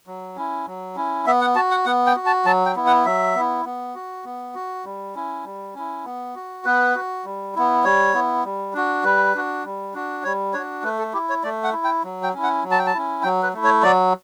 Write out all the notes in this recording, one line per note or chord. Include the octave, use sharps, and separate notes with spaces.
F#3
C#4 E4
F#3
C#4 E4
B3 E5
F#5
F#4 A5
F#5
B3 F#5
G5
F#4
A5
F#3 A5
G5
B3 E4
F#5
F#3 E5
B3 E4
B3
F#4
B3
F#4
G3
C#4 E4
G3
C#4 E4
B3
F#4
B3 B4
F#4
G3
B3 E4
G3 C#5
B3 E4
G3
D4 F#4
G3 B4
D4 F#4
G3
D4 F#4
G3 C#5
D4 F#4 C#5
A3 B4
A4
E4 G4
C#5
A3 D5
F#5
E4
G5
F#3
G5
C#4 E4
F#5
F#3
A5
G5
A5
C#4 E4
F#3 G5
B4
A3 E4
C#5
F#3 D5